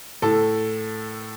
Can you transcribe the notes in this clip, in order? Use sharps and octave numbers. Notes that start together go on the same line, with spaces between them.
A2 A4